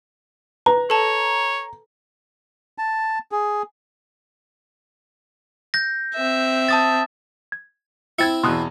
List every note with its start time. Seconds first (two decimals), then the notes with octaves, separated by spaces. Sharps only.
0.66 B4 A#5
0.90 A4 C#5 A5
2.78 A5
3.32 G#4
5.74 G6 A#6
6.15 C4 E5
6.69 A5 D#6 A6
7.52 G#6
8.19 C4 E4 G#6 A6 C#7
8.43 E2 B2 C6 D#6 F#6